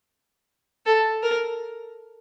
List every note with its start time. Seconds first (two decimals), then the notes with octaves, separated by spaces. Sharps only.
0.86 A4
1.22 A#4